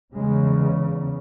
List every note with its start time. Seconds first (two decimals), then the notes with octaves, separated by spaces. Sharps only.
0.15 E2 C#3 G#3